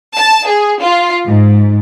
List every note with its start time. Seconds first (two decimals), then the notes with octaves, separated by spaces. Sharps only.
0.17 A5
0.47 G#4
0.81 F4
1.26 G#2